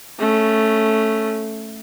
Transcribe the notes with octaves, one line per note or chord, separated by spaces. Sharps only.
A3 C#4